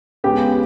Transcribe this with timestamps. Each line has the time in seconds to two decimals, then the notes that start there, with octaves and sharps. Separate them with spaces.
0.24 C#2 C#3 G#3 B3 G4 G5